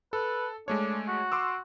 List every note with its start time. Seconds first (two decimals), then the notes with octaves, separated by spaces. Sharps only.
0.13 A4 B4
0.68 G#3 A3 D4 C#5
1.08 F#4
1.32 C6 D6 E6